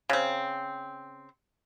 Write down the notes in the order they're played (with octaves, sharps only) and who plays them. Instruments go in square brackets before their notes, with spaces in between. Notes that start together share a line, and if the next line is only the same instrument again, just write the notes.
[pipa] C#3 C4